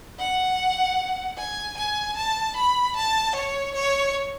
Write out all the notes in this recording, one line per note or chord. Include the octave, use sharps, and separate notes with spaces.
F#5
G#5
G#5
A5
B5
A5
C#5
C#5